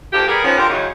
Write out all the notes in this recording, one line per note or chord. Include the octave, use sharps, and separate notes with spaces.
D2 A#2 A#3 G4
G3 B3 G#4 A#4
D#3 F3 B3 C#4
D3 F4 G4 A#4
E2 C#3 F#3 D#4